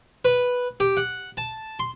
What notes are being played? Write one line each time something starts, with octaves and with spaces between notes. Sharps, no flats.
B4
G4
F#5
A5
C6